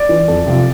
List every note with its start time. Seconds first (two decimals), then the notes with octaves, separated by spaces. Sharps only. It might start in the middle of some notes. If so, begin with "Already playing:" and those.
Already playing: D5
0.09 E3
0.28 F2
0.46 C3 F3